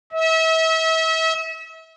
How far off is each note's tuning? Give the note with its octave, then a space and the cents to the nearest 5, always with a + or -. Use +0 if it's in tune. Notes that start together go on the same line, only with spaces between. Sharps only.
E5 -35